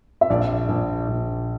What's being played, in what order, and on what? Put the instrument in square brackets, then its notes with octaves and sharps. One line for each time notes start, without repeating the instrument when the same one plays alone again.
[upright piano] E5
[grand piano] A#1 [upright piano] D5
[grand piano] A#1
A#1